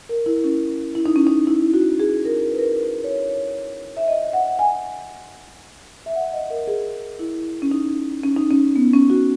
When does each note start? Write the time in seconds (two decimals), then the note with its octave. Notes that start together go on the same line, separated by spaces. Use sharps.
0.09 A#4
0.26 E4
0.44 C#4
0.95 E4
1.06 D#4
1.16 C#4
1.27 D#4
1.47 E4
1.74 F#4
2.00 G#4
2.25 A#4
2.52 B4
2.59 A#4
2.66 B4
3.04 C#5
3.29 C#5
3.97 E5
4.08 D#5
4.33 F#5
4.59 G#5
6.06 E5
6.15 F#5
6.33 D#5
6.50 A#4
6.67 G#4
7.19 E4
7.62 C#4
7.71 D#4
8.23 C#4
8.37 D#4
8.51 C#4
8.76 B3
8.94 C#4
9.10 F#4